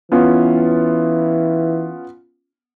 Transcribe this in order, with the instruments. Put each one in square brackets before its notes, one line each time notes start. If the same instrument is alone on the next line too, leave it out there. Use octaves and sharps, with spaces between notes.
[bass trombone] E3 [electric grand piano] B3 C#4 F4